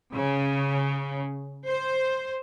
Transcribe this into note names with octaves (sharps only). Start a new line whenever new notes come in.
C#3
C5